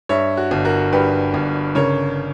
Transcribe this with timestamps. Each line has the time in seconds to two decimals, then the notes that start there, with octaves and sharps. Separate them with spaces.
0.09 G2 C#5 E5
0.37 F#4
0.51 G1
0.65 F#4 A#4
0.92 G2 G4 B4
1.34 G1
1.75 C#3 A#4 C#5